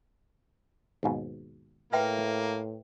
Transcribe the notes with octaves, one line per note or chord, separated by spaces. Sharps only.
D#2 G#2 B2
A2 A#3 B4 E5 G5